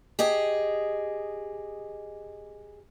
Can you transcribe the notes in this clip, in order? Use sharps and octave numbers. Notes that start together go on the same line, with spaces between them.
G4 G#4 D#5